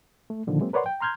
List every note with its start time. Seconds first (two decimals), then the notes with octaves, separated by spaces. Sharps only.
0.30 A3
0.47 A#2 D3 D#3 F3
0.60 F#3 G#3 A#3 C4
0.73 A#4 B4 C#5 D5 F#5 C6
0.86 G5
1.00 A#5 C6 F6 G6 G#6